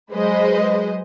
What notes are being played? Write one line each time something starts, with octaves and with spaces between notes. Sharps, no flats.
F#3 G#3 B4 C5 D#5